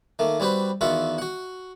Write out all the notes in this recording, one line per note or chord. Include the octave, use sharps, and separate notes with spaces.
D#3 A3 A#3
G3 C4 F#4 B4 C5
E2 D#3 F4 F#4 E5 F#5
F#4 F#5